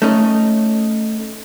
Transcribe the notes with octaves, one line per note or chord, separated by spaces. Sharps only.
A3 C#4 D#4